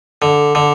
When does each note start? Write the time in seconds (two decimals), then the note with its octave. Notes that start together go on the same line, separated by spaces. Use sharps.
0.22 D3
0.55 D3